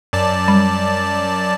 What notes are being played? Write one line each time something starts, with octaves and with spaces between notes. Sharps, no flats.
F#2 D5 A5
G3